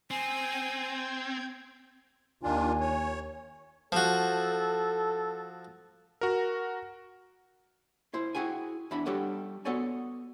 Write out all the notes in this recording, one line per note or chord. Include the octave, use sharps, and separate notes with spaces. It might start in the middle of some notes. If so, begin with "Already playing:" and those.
C4 G5 G#5 G6 G#6
D#2 D#3 D4 F4 G#5
C#5
F3 F#4 A4
F#4 A#4
E4 C5
E4 F#4 G#4 G5 G#5
E2 D4 E5 B5
G3 D4 G4 A4 C#5 F#5
B3 F#4 A4 C#5 D5 G#5